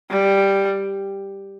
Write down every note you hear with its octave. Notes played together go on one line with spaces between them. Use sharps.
G3